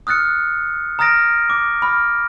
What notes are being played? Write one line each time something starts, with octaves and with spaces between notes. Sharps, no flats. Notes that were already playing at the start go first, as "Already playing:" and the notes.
D#6 F6 F#6 A6 C#7
A#5 D#6 F6 A6 A#6 D7
D6
B5 F6